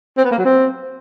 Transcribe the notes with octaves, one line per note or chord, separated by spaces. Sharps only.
C4
B3
A#3
F#3
C4